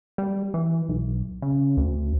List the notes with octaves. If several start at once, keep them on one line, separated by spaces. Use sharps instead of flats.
G3
E3
B1
C#3
D2